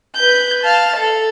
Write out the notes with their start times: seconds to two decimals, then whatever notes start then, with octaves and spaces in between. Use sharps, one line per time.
0.16 B4 G6
0.63 F5 A5
0.97 A4